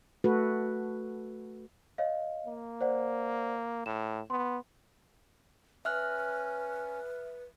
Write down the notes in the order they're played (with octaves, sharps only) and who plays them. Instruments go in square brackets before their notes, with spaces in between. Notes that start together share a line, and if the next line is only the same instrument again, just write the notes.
[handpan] A3 F#4 A4 B4
[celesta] C#5 D#5 F5
[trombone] A#3
[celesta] C5 D5 F#5
[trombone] A2 [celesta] E7
[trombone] B3 [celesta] C6
[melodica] C#4 [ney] B4 [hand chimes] E5 F6 F#6